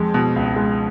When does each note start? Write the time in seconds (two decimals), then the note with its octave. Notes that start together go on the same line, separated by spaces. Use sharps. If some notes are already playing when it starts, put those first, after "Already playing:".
Already playing: F2 G#3
0.14 B2
0.36 C#2
0.56 G#3